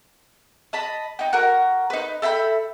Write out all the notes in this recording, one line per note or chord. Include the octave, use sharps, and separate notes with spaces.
D#5 A5 B5
D#4 G5
F#4 A#4
D#4 B4
A4 E5 G5 B5